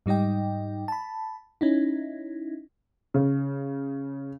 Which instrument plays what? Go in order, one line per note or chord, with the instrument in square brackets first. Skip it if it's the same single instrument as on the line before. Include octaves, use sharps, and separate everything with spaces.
[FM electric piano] G#2 G3 D#4 D#5 G5
A5 B5
C#4 D#4 E4
[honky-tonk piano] C#3